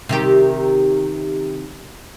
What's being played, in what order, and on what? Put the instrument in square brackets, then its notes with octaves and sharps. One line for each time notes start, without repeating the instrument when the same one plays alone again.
[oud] C3 D#3 G4